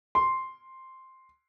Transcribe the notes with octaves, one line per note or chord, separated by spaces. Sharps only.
C6